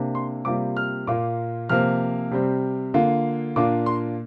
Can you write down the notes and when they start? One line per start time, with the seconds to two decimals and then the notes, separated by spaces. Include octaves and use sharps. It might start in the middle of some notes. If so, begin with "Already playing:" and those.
Already playing: C3 A#3 D4
0.15 C6
0.45 C3 G3 A#3 F4 D6
0.77 F6
1.07 A#2 A#3 F4 D6
1.69 C3 F3 A#3 F6
2.31 C3 G3 C4
2.94 D3 A#3 F4
3.56 A#2 A#3 D4 F4 D6
3.86 C6